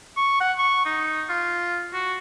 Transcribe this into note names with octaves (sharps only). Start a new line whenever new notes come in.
C#6
F#5
C#6
D#4
F4
F#4